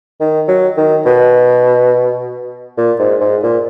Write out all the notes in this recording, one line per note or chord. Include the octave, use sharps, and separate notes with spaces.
D#3
F#3
D#3
B2
A#2
G#2
G#2
A#2